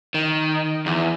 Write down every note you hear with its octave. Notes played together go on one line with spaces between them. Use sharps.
D#3
E2